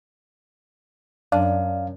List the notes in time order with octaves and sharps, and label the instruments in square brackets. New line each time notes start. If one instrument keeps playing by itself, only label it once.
[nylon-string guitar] F#2 [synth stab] D4 [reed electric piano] F5